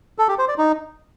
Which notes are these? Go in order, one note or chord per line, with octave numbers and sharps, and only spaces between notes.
A4
G4
C5
D5
D#4